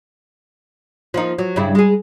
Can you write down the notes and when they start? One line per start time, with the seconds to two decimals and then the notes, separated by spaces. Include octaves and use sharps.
1.14 F3 A#3 D#4
1.38 F#3
1.56 G2 C#3 E4
1.75 G#3 G#4